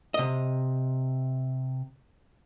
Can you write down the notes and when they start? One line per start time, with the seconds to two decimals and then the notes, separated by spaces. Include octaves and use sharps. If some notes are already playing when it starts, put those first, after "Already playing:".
0.14 C3 D#5